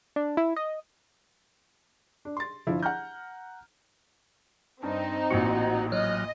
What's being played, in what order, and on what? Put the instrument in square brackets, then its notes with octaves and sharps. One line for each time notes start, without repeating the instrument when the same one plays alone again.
[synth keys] D4
E4
D#5
[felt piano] D4
C6 A6
G1 F3 E4
F#5 A#5 F6 G6
[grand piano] G2 [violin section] C4 D#4
[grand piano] A1 A#2 [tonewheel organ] F#4 F#5
[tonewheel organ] F#3 F6 F#6 [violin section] D#5